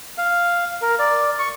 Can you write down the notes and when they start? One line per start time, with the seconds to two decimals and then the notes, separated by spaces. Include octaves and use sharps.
0.18 F5
0.82 A#4
0.99 D5
1.39 C#6